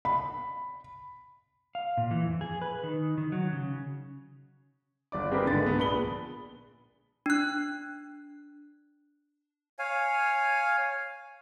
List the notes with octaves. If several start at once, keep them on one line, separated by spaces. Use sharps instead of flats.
B5
F5
A#2
E3
F2
G#4
B4
D#3
D#3
F#3
C#3
G1 D5 D6
C4 D4 G4 G#4 A#4 B4
G#1 C#2 D3 A6
G#3 B3
A#1 B5 G7
D4 F#6
C#5 F5 G#5